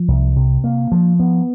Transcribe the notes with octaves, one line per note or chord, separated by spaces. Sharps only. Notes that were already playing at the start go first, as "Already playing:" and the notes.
Already playing: F3
C2
C3
A#3
F3
B3